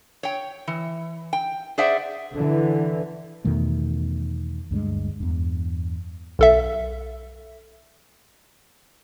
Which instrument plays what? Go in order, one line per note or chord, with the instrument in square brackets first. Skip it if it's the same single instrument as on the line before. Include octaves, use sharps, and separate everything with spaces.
[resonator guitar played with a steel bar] C#5 G5
E3
G5
G#4 C5 D5 E5 F#5
[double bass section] D3 E3
[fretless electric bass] E2 B2 D#3 A3
D2 G2 G3 G#3
E2 G2
[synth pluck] B1 A4 E5